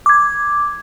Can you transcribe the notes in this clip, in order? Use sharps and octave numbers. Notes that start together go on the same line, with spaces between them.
D6 G#6